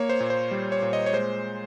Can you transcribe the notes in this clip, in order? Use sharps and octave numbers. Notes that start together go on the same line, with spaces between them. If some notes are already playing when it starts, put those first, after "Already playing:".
Already playing: A#3 C#5
C5
A#2
C5
G3
C#5
A#2
D#5
C#5
G#3 C5